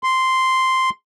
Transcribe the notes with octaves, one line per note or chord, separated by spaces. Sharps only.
C6